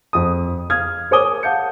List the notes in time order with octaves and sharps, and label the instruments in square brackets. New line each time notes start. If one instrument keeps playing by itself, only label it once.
[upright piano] F2 D#6
F5 D#6 F6 G#6
A#4 C#5 G#5 D6 D#6 G7
F5 F#5 A5 G6 C#7